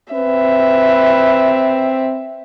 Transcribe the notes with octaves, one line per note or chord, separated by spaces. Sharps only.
C4 B4 E5